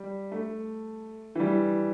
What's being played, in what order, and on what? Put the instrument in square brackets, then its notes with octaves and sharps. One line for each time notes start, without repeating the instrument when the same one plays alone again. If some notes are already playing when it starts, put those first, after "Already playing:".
Already playing: [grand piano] G3
A3
E3
G3